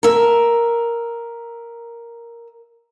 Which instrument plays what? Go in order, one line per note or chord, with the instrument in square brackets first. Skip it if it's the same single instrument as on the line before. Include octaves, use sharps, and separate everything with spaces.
[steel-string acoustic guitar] A#4 E5